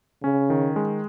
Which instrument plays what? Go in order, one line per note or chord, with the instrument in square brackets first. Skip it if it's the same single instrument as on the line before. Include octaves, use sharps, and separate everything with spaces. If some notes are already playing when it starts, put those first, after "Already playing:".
[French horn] C#3 [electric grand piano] C#4
[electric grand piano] D#3
G#3